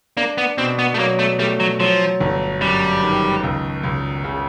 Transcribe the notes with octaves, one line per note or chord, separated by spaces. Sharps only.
A#3 D4
B3
B2 C4
B3
A3
F#3 A#3
A3
G3 A3
F#3
F3 F#3
G1
F#2 G3
D#3
C#2
C#2
C#3